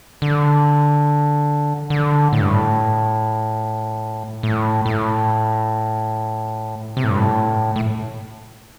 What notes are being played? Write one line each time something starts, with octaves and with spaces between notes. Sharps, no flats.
D3
D3
A2
G2
A2
A2
A2
C3
A2
G2
A2
A2